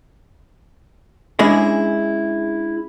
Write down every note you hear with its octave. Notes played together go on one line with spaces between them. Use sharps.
G#3 C#4 D4 E4 G#4 D#5